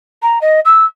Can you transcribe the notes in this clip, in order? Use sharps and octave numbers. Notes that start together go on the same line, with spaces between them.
A#5
D#5
E6